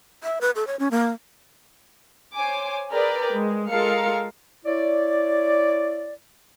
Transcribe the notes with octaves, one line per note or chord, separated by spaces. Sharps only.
E5
B4
A4
C#5
C#4
A#3
C5 C#5 G#5 D6
G#4 A#4 B4 D5 G5
G#3
G#3 F4 A4 A#4 F5 C#7
E4 C#5 D5